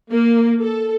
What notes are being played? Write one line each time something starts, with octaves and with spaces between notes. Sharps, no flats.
A#3
A4